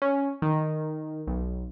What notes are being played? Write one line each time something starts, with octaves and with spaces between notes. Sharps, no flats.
C#4
D#3
B1